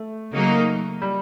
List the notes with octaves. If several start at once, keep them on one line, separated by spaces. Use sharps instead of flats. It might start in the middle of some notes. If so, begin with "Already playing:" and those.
Already playing: A3
C#3 F#3 A#3 D#4
G3